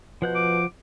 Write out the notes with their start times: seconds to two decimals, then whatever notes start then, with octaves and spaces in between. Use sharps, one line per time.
0.22 B2 F3 F#5 G6
0.35 D6